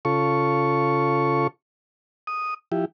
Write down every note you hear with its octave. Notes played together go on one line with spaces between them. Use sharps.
C#3 F4 A4 C#6
D#6
F3 E4 G4